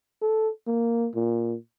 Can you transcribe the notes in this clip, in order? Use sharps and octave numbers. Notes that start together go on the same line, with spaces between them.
A4
A#3
A#2